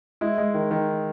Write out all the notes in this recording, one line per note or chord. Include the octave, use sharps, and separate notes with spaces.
G#3 E4
G#3
D#3
D#3